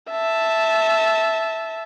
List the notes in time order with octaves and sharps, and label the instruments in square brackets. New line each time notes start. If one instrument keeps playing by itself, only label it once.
[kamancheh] E5 A5